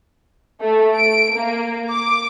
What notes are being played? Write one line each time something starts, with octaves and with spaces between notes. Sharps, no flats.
A3
D7
A#3
D6